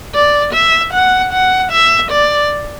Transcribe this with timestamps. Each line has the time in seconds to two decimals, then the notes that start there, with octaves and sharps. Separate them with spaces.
0.14 D5
0.53 E5
0.93 F#5
1.33 F#5
1.72 E5
2.11 D5